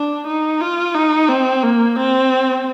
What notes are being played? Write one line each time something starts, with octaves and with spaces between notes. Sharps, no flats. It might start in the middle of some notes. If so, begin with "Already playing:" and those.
Already playing: D4
D#4
F4
D#4
C4
A#3
C4